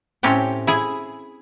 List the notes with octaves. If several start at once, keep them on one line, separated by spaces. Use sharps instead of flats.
A2 C4 C#4 G4 G5
E4 G#4